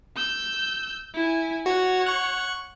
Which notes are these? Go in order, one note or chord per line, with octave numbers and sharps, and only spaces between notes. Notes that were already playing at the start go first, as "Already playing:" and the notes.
E6 G6
E4 G#5
F#4 C#5 F#5
C#6 F#6